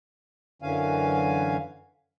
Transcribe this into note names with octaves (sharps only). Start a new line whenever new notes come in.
F#2 D3 E3 C#4 F5 G#5